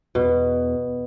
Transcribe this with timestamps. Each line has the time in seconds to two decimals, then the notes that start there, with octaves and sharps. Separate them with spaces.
0.15 E2 B2